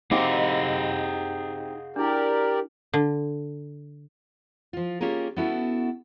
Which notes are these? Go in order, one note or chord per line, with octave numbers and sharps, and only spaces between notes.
C4 D#4 G4 G#4 F5 F#5 C6 D6
D#5
D4 E4 G4 A#4 D5
D3
F3 F4
A#3 C#4 F4 G4 G#4 A#4
B3 C#4 E4 F#4 A4